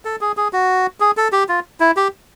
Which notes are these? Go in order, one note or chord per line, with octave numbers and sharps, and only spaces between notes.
A4
G#4
G#4
F#4
G#4
A4
G4
F4
E4
G4